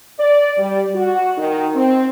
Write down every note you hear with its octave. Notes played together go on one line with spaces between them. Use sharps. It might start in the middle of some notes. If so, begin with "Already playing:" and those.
D5
G3
F#4
D#3
C4